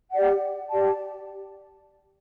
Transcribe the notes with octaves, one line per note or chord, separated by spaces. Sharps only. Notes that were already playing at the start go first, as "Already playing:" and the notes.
G4 D5 F#5
G4 D5 A5